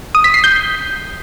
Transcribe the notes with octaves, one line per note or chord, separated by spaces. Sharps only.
D#6
B6
C7
G6